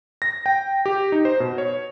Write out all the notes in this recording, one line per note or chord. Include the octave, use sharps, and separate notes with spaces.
A#6
G5
G4
D#4
C5
B2
C#5